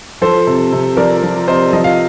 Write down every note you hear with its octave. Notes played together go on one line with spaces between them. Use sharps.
F3 A4 C5
C3
C3
F3 A#4 D5
F3
C3 C5 D#5
F3 D#5
F5